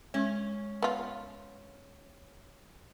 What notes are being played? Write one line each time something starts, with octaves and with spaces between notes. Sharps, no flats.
G#3 C#4 C#6
B3 F4